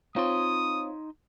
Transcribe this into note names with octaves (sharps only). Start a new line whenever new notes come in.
C4 D#4 F4 C#5 C6 D#6